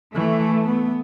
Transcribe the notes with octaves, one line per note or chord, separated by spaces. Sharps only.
E3 A3
B3